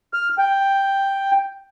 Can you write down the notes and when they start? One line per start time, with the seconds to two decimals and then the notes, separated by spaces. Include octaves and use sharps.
0.14 F6
0.39 G5